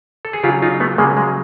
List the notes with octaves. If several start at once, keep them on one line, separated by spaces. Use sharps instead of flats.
A4
G#4
C#3 F#3 F4 G4
D#4 F4
A3 B3
C#3 F#3 G#3 A#3
G#3